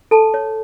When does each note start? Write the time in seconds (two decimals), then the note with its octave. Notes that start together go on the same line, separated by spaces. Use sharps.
0.11 A4 A5
0.34 C#5